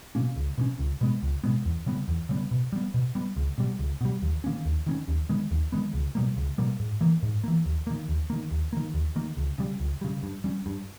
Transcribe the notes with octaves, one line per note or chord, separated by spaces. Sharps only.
B2 A#3 C#4
C#2
B2 A#3 C#4
C#2
B2 G#3 B3
C#2
B2 G#3 B3
E2
C#3 G3 B3
E2
C#3 G3 B3
B2
G3 B3
B2
G3 B3
C#2
B2 G3
C#2
B2 G3
D#2
D#3 A#3 C#4
D#2
D#3 A#3 C#4
D#2
D#3 G#3 B3
D#2
D#3 G#3 B3
C#2
B2 G3 A#3
C#2
B2 G3 A#3
G#2
E3 A#3
G#2
E3 A#3
D#2
D#3 A#3
D#2
D#3 A#3
D#2
D#3 A#3
D#2
D#3 A#3
C#2
C#3 G3
C#2
C#3 G3
G2
G3 C#4
G2